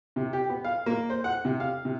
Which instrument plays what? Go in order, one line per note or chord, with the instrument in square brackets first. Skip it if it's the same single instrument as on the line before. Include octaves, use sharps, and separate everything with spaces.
[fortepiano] C3
G4
B3
F5
A#3
C5
F#5
C3
F5
C3